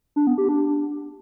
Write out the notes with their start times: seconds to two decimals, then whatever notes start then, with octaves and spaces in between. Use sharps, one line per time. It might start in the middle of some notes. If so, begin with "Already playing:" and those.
0.16 D4
0.27 B3
0.38 G4
0.49 D4